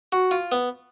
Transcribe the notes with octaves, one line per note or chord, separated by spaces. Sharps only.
F#4
F4
B3